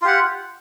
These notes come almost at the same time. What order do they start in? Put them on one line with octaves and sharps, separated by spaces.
F4 G4 F#5